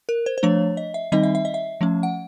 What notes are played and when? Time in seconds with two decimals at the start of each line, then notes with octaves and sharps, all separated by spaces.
0.09 A#4
0.26 C5
0.38 C5
0.43 F3 A3 D4 C#5
0.77 D#5
0.94 E5
1.12 D#3 G3 C4 D#4 D#5
1.23 E5
1.35 E5
1.45 D#5
1.54 E5
1.81 F3 A3 C#4
2.03 F#5